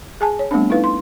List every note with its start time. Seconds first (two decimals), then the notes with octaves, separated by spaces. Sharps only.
0.21 G#4 G#5 A5
0.39 C#5
0.51 G3 A3 B3 C4 D4
0.70 D#4 E4 A4 B4 F5
0.84 C6